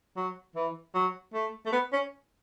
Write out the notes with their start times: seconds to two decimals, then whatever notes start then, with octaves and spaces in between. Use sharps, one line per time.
0.16 F#3
0.55 E3
0.95 F#3
1.34 A3
1.66 A3
1.72 B3
1.93 C#4